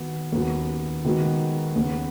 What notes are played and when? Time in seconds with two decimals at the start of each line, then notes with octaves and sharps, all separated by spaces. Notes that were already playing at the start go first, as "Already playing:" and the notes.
Already playing: D#3 B3 F#4
0.32 D#2 C#3 B3 F#4
1.05 D#3 G#3 B3 F#4
1.76 D#2 C#3 B3